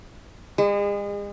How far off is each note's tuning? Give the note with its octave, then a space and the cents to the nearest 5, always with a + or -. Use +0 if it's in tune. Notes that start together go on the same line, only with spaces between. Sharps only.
G#3 -40 G#4 -25